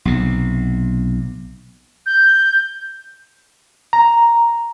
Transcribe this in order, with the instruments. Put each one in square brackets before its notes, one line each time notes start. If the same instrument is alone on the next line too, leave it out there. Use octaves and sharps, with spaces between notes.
[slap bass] B1 C3
[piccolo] G6
[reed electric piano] A#5